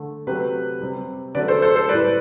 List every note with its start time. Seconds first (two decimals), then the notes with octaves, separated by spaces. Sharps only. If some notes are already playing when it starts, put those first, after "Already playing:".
Already playing: D3 A3
0.27 C3 F#3 A3 G4 B4
0.81 C3 G3
1.35 D3 F#3 A3 B4 D5
1.48 A4 C5
1.62 A4 C5
1.76 A4 C5
1.89 A2 G3 B4 D5